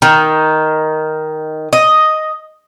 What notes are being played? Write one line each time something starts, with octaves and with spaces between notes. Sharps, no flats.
D#3
D#5